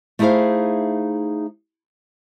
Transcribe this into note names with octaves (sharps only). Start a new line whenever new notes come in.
A3 D#4 E4 G#4 C5 F5